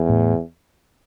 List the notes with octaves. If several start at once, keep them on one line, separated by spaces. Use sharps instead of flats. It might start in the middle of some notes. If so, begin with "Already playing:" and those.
Already playing: E2
A2